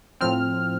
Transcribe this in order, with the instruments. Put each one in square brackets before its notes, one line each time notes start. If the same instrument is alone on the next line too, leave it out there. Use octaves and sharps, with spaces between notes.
[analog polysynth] A2 F3 C4 F6